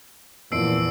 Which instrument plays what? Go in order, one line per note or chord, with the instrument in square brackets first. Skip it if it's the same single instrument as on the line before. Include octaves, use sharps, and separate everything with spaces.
[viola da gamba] E2 [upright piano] A#2 F3 [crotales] E6 C7 D7